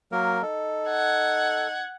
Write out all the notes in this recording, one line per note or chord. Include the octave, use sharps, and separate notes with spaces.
F#3 A#3 A#4
D#4 A4
F#5 G#6